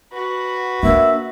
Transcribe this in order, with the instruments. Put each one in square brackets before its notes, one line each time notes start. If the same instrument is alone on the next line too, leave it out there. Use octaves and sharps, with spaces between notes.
[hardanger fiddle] F#4 B4
[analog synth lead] A#3 [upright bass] D4 [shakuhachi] E5